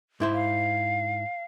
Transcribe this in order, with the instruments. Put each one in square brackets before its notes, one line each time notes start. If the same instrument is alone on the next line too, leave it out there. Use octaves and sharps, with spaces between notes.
[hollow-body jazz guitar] G#2 E4 C5
[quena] F5